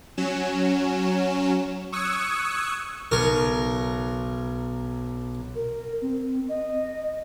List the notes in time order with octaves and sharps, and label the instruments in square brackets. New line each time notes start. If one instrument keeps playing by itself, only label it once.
[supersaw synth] F#3 C#4 E7
C#6 D#6 E6 F#6 G#6 C#7
[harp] B1 [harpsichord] A#4 C#6
[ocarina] A#4
C4
D#5